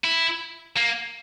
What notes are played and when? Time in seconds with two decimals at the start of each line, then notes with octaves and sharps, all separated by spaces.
0.04 E4
0.76 A#3